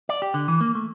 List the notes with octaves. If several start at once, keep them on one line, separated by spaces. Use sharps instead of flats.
D5
G4
D3
E3
A#3
A3